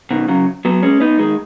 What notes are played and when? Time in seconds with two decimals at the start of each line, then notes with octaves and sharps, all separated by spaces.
0.11 B2 D#3
0.28 C#3 F#3
0.65 F#3 B3
0.83 G#3 C#4
1.00 B3 D#4
1.19 D#3 G#3